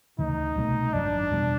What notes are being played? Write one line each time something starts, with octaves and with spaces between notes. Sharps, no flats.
D2 C#3 E3 D#4
C2 B2 F#3 A3
G#1 F#2 D#3 F#3 D4
E1 E2 B2 G3